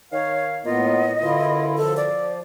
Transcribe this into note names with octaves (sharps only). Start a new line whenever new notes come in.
D#3 C#5 F5
A2 A#3 B3 F4 D#5
F#2 B2 D3 E4 F4
F3 A4
D5